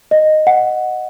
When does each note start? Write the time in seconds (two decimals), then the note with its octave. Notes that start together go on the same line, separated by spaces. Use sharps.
0.11 D#5
0.47 F#5